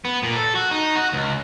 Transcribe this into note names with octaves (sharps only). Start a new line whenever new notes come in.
B3
A#2
A4
F#4
D#4
F#4
C#2